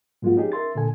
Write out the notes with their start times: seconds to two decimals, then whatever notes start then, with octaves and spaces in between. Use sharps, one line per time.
0.22 G#2 F3 G#3 A#3 F4 F#4
0.36 C#4 D#4 G4 G#4
0.52 A#4 E5 C6 A6
0.75 A#2 D3 A4 G#5